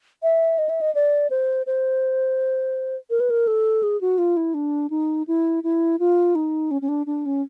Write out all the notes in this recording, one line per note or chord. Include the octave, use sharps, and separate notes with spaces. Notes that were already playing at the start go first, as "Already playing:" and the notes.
E5
D#5
E5
D#5
D5
C5
C5
A#4
B4
A#4
A4
G#4
F#4
F4
E4
D4
D#4
E4
E4
F4
D#4
C#4
C#4
D4
D4
C#4